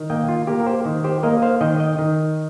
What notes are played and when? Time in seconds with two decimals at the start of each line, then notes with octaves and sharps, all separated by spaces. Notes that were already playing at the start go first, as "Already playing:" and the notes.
Already playing: D#3
0.10 A#3 D#5 G5
0.28 F4
0.47 A#3 G4
0.60 A#4
0.66 G4 C5
0.85 D#3
1.04 G4 C5
1.23 A#3 A#4 D#5
1.42 C5 F5
1.61 D#3 D#5 G5
1.80 D#5 G5
1.99 D#3